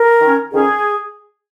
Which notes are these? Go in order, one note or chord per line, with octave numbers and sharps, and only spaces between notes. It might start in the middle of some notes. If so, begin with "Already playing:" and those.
Already playing: A#4
D#3 C#4
F2 D#3 C#4 G#4